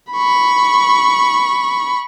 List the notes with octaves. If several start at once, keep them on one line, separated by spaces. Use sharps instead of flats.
B5 C#6